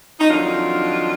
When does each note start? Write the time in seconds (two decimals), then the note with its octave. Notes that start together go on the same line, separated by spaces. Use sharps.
0.20 D#4
0.30 F2 D#3 F#3 D4 F4